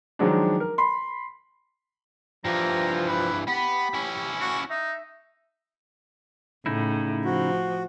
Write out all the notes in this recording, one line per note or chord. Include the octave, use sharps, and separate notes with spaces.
D#3 F3 F#3 G#3 D4
A#4
B5 C6
G2 E3 F3 A#5
B4
B3 G4 B5
C#4 E4
F#4
D#4 E5
A2 C#3 D#4 E4
F3 F#4